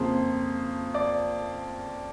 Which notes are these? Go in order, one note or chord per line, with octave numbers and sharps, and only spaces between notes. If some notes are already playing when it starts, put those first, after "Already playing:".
Already playing: F2 C#3 F3 A#3 C5
D5